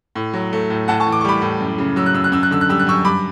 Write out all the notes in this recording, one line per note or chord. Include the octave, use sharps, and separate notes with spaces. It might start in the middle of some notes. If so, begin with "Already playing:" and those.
A2
F#3
A3
A2
A2 F#5 A5
A5 C#6
E3
D6
C#6
G3 B5 D6
A2
F#2
C#3
F#3 E6
F#6
F#2 E6
F#6
F#2 E6
F#6
D3 E6
F#6
G3 E6
F#6
F#2 C#6 E6
G2 B5 D6